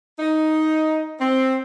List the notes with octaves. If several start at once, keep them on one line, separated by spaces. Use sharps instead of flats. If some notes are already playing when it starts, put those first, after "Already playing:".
D#4
C4